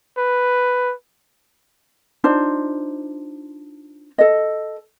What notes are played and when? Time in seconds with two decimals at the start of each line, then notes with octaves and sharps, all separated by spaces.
0.17 B4
2.24 D4 D#4 F4 C5
4.18 A4 D#5